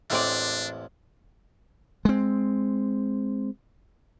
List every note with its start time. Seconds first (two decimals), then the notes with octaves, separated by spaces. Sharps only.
0.10 A1 E2 A2 G#3 C4 D4 D5
2.05 G#3 C4